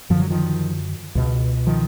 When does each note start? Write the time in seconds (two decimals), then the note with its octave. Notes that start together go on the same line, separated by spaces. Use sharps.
0.10 F#2 D3 F3
0.20 F#3
0.30 D#3 F3
1.15 C#2 B2
1.67 D#3 F3